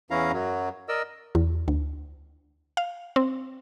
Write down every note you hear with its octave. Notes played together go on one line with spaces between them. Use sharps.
E2 E3 C#4 E4 F5 A#5
F#2 F#3
A#4 D5 D#5 E6
E2
D2
F5
C4